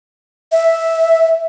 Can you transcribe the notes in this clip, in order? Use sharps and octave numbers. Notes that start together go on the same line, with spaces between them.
E5